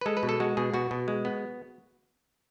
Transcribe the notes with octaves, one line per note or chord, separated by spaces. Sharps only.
B4
G#3 A4
B4
B2
A4
G#3 F#4
B2 G#4
B2 F#4
B2
G#3
B3